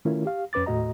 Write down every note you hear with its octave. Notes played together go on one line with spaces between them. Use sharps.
D#3 A3 C#4 E4 F4 A#4
G4 F5
F2 C#4 B4 D6 A6
D#2 A2 A3 F#4 D#5 A#5